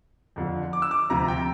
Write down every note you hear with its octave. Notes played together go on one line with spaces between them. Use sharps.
F2 D3 F3
D6
E6
D6
D2 C3 F3 A#5
G5